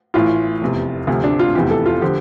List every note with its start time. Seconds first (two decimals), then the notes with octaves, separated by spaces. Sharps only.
0.14 A1 A2 E3 F4
0.62 F1 E2 C3
1.07 D2 C3 F3
1.24 D4
1.39 F4
1.55 F1 E2 C3 E3 G4
1.70 A4
1.86 F4
2.02 D3 F3 G4